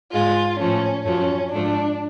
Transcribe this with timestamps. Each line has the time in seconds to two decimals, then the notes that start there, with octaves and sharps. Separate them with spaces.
0.13 G#2 G#3 F4
0.59 A2 F3 A3 C#4
1.05 F#2 F3 A3 C#4
1.52 G#2 F3 A3 D4